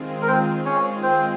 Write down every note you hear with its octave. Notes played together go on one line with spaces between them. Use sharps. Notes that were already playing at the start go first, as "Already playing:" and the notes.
Already playing: D#3 G#3 C4 F4 G#4
A#4
C4 C5
C#4 C#5
C4 C5